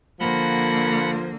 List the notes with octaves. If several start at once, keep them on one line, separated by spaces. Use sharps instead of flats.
D3 F3 A#3 F#5 B5